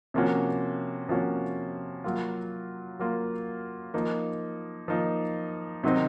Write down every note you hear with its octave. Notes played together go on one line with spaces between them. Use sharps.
C3 F3 A#3 C#4 F#4
C3 F3 A#3 C#4 F#4
F#3 A#3 F4
F#3 A#3 F4
F3 A#3 D#4
F3 A#3 D#4
C3 D#3 F#3 C4 D#4